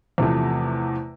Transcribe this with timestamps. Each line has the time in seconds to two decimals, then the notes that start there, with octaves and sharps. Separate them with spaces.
0.18 E2 C3 F3 A3